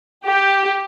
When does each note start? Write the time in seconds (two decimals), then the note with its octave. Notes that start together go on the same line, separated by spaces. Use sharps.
0.25 G4